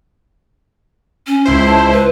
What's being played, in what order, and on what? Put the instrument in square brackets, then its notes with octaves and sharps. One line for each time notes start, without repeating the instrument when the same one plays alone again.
[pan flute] C#4
[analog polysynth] C#2 E4 C5
[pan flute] A5
B4